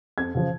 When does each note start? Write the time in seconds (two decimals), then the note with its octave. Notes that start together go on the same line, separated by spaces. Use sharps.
0.18 F2 G#6
0.35 C#3 F3